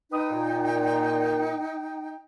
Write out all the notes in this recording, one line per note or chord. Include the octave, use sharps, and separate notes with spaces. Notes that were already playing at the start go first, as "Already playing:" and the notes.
D#4 B4 G5 D#6
A#2